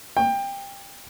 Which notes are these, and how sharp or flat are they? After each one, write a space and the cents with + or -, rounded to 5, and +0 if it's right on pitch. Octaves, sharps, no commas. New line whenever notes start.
G5 +20